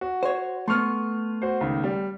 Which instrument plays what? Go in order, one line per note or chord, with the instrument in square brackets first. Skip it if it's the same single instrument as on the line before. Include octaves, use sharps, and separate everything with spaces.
[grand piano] F#4
[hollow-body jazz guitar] C5 C#5
[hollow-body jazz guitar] A3 B3 [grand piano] C6 C#6 F6
[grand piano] F#4 C5
C#2 D#3
G3